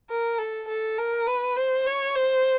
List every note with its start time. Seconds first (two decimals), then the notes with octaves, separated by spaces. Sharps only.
0.10 A#4
0.38 A4
0.68 A4
0.98 A#4
1.27 B4
1.56 C5
1.86 C#5
2.16 C5